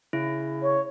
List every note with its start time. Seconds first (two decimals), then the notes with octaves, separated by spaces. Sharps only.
0.13 C#3 E4
0.62 C#5